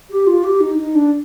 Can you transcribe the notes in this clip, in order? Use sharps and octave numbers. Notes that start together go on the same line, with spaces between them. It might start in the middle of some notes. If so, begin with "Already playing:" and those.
G4
F4
G4
D#4
D#4
D4